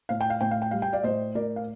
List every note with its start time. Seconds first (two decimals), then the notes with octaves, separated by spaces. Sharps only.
0.09 A2 F5
0.21 G5
0.30 F5
0.41 A2 G5
0.51 F5
0.62 G5
0.71 G3 F5
0.82 G5
0.93 D5 F5
1.03 A2 C5 D#5
1.35 A2 A#4 D5
1.56 F5